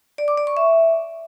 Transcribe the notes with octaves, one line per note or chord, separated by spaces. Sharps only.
D5
D6
D5
C#6
E5